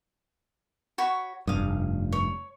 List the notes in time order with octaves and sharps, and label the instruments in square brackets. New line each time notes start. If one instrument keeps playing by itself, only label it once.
[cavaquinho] F#4 C#5 B5
[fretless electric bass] F1 G2 [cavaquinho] F5 D#6
[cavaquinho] C#5